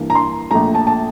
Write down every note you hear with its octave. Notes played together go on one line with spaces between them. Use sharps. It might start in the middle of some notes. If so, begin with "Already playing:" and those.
Already playing: G2 E3 A#3
A#5
C6
A#1 A#2 A3 A#5
A5
A5